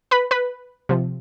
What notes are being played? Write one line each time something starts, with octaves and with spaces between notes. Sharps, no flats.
B4 B5
B4 B5
C3 F3